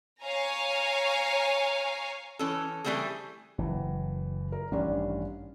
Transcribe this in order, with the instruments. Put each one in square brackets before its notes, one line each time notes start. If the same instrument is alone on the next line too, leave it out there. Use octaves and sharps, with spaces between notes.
[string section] C#5 F5 G#5 A#5
[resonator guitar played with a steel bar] E3 C#4 A4
E3 F#3 G3 A3 C4 G#4
[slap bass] F#1 [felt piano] E3
[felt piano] A#4
[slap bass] A1 G2 D#3 [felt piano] G3 C#4 D4